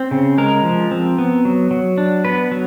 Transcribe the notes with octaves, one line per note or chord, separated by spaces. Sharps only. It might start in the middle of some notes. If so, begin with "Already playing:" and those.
Already playing: C4
C#3
G#3 A#4
F3
C4
B3
F#3
F#3
D4
B3 B4
F#3